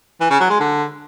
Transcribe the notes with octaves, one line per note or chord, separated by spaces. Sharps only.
E3
C#3
F#3
G#3
D3